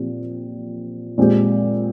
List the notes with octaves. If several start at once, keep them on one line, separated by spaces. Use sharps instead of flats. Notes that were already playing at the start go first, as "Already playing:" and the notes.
Already playing: A#2 F3 C4 G4
A#2 G#3 C4 G4